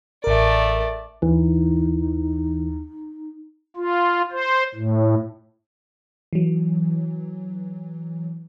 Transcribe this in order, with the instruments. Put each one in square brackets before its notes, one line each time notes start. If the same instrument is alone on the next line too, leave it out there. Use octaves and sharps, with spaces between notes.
[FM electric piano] A1 A#4 [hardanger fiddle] A3 D5
[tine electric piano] D#2 [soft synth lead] E3 [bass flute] D#4
[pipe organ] F4
C5
A2
[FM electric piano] E3 F#3